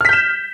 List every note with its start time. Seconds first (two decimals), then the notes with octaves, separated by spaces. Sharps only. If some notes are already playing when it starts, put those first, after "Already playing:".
0.01 F6
0.05 B6
0.09 G6
0.13 E7